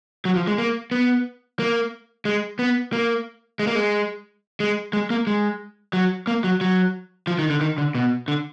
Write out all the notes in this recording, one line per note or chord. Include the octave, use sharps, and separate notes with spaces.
F#3
F3
G#3
A#3
B3
A#3
G#3
B3
A#3
G#3
A#3
G#3
G#3
G#3
A#3
G#3
F#3
A#3
F#3
F#3
F3
D#3
D3
D#3
D3
B2
D3